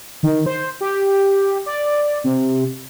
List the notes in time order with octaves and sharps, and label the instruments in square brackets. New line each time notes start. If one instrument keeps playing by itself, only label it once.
[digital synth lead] D#3
C5
G4
D5
C3